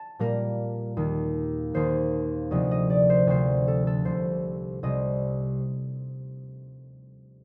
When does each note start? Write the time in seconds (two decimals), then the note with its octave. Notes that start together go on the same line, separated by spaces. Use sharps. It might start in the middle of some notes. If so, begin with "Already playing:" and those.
Already playing: A5
0.19 A#2 G3 A#3 A#4
0.97 D#2 D#3 A#3
1.74 D#2 D#3 A#3 C5
2.51 D2 C3 F3 C4 D#5
2.71 D#5
2.90 D5
3.10 C5
3.27 D2 C3 F3 C4 C5
3.68 A4
3.87 A4
4.05 C2 C3 G3 C5
4.83 C2 C3 G3 D#5